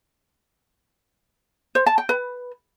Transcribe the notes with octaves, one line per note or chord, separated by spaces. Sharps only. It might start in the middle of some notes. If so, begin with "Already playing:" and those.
C5
A5
G5
B4